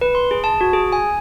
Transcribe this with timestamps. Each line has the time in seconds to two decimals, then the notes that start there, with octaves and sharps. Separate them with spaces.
0.01 B4
0.15 C6
0.31 G#4
0.44 A5
0.61 F#4
0.73 G#4
0.92 G#5